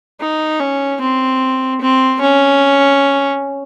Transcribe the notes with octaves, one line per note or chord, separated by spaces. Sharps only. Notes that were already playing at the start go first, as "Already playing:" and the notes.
D#4
C#4
C4
C4
C#4